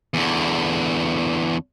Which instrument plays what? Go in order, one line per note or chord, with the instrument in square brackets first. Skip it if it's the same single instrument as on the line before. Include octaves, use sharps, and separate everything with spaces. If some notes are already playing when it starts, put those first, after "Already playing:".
[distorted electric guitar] E2 D3